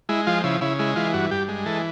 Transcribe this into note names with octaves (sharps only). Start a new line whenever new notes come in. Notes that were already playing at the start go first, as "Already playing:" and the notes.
G#3 E4
F3 F4
C#3 E4
C#3 E4
G#3 E4
E3 F4
G2 F#4
G2 G4
G#3
E3 A4